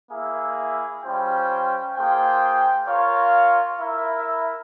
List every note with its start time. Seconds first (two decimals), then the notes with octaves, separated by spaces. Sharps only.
0.11 A#3 E4 G#4 E5
1.03 G3 C#4 F4 C5 G5
1.96 A#3 F4 G#4 C5 G5
2.88 F4 A#4 C#5 F5
3.80 E4 A#4 E5